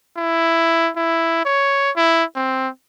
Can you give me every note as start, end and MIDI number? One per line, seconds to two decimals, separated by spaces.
0.17 0.91 64
0.96 1.44 64
1.45 1.91 73
1.96 2.24 64
2.35 2.68 60